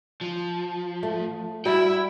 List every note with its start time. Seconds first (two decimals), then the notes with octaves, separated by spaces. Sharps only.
0.21 F3
1.03 A3
1.65 G3 E4 F#4 G5